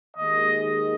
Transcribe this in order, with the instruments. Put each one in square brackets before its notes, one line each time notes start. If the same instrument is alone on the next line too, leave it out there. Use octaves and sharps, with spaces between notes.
[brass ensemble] D#2 D#3 G#3 D#5